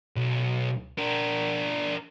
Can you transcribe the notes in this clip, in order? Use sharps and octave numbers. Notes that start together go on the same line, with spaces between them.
B1
D4 A#4